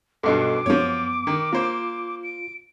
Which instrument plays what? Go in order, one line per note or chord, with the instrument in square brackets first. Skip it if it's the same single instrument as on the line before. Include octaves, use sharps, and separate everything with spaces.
[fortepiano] B1 G2 B2 [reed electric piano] A4 D#5 [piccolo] D6
[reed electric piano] F#2 B3 [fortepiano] F3 C#5
[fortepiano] D#3
[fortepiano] A#3 C5 [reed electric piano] F4
[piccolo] D7